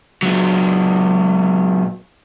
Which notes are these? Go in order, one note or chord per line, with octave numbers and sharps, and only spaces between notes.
A#2 F#3